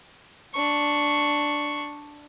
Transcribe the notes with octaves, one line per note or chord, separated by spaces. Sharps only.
D4 C#6